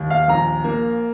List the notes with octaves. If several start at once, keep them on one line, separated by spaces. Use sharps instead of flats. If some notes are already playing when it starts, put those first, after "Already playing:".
Already playing: D#2
F5
A#1 A#5
A#3